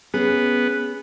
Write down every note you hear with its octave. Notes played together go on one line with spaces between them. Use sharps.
B3 C#4 G#4